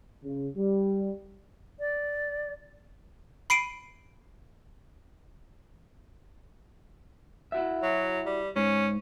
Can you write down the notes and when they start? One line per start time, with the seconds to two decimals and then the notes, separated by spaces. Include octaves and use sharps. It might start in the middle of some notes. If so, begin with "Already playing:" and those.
0.24 C#3
0.57 G3
1.80 D5
3.50 B5 C7 D7 D#7
7.52 E4 F#4 E5
7.83 F#3
8.26 G3
8.56 G#2 C#4